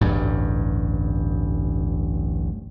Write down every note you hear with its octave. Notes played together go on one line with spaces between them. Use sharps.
D1 A1 G2